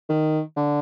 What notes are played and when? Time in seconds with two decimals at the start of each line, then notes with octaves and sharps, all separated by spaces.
0.09 D#3
0.56 D3